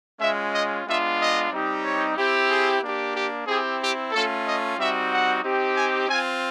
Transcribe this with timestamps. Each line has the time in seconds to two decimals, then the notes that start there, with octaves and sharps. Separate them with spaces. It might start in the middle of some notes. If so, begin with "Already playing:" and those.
0.19 G#3 C#4 F4 E5
0.52 D#5
0.85 G#3 B3 D4 F4 E5
1.18 D#5
1.50 G3 C4 D#4 G4
1.84 C#5
2.15 C4 E4 G4
2.49 G#4
2.81 A#3 D4 G4
3.14 G4
3.46 C4 E4 G4 G#4
3.80 G4
4.11 A3 C#4 F4 A4
4.44 D#5
4.77 G3 C4 D#4 F#4 E5
5.10 F#5
5.42 C4 D#4 G4
5.75 G#5
6.08 C4 F4 G#5